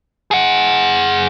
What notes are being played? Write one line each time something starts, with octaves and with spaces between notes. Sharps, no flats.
G#4 F#5